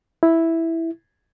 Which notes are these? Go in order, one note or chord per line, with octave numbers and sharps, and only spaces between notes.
E4